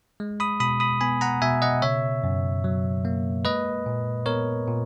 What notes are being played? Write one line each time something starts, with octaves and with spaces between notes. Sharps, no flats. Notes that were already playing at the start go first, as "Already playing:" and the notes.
G#3
B5 D#6
B2 B5 D#6
B5 D#6
B3 G#5 B5
F#5 A#5
B2 E5 G#5
D#5 F#5
C#3 C#5 E5
F#2
F#3
A#3
G#3 B4 D#5
A#2
B3 A#4 C#5
A#2